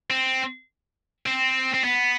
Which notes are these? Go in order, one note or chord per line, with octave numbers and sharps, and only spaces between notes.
C4
C4
C4
B3